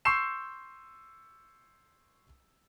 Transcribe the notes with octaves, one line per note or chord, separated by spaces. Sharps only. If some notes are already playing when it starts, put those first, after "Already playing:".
C6 C#6 E6 G6 C7 E7